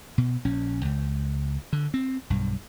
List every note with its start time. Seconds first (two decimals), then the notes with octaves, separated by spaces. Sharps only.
0.18 B2
0.45 A#1 C#4
0.85 C#2
1.73 D3
1.94 C4
2.30 B1 G2